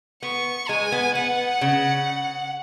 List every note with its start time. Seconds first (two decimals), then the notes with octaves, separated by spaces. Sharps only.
0.22 B3 C#6
0.69 G#3 G#5
0.92 B3
1.15 B3 F#5
1.61 C#3